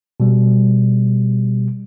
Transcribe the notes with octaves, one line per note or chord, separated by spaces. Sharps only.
B2 G3